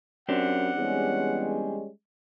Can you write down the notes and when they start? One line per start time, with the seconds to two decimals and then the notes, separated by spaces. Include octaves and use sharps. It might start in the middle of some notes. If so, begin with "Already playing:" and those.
0.29 F#2 C4 D4 G4 F#5
0.77 E2 G3 G#3 C#4